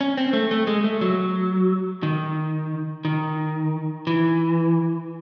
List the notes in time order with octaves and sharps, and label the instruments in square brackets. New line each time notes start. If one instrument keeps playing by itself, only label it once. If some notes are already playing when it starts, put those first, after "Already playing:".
[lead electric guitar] C#4
C4
A3
A3
G#3
A3
F#3
D#3
D#3
E3